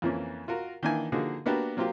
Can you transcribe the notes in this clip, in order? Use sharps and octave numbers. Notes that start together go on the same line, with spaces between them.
F2 E3 F3 A#3 C#4
F4 F#4 A#4
D#3 E3 A#3 D4 E4 G#5
D3 F3 A#3 D#4 F#4 G#4
A#3 B3 D4 F#4 G4 A#4
F#3 A#3 C4 F4 G4